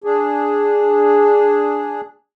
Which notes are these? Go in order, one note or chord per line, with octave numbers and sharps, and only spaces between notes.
D4 G#4